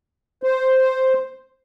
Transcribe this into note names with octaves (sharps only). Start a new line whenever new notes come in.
C5